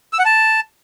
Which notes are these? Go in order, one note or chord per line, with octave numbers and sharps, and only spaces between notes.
E6
F#5
A5